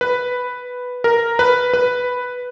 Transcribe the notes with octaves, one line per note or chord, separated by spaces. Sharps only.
B4
A#4
B4
B4